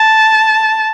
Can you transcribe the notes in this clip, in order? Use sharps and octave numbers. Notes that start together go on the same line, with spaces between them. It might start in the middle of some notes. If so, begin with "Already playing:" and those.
Already playing: A5